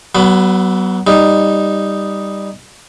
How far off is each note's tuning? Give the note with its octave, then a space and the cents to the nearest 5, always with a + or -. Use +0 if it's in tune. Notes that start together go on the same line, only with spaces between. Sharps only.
F#3 +30 B3 -15 B5 +25
G3 +10 D#4 +0